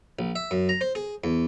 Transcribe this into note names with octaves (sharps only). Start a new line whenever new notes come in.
A#1
E5
F#2
A#5
C5
G#4
E2